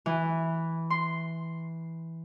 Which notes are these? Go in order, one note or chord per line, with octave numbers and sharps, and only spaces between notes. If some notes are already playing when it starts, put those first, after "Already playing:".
E3
C6